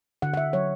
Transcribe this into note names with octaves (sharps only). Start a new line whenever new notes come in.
D3 F#5
F#5
E5
F#3 C#5